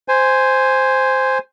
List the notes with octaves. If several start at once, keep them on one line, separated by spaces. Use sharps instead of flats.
C5 G#5